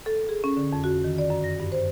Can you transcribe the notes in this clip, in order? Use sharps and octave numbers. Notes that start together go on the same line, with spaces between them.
A4
G#4
C#4
D3
F2
F#4
D#3
D5
F#2
A#6
G2
C5